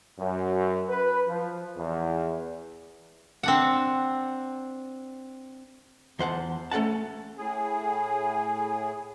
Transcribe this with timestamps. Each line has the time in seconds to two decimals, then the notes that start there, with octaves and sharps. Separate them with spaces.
0.18 F#2
0.89 B4
1.28 F3
1.76 E2
3.43 C4 D4 F#5
6.19 E2 C5 F#5 A5
6.71 A3 C#4 A4 F#5 A5
7.38 A2 G#4